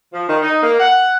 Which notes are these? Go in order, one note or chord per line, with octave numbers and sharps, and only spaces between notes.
F3
D#3
D#4
A#3
F#5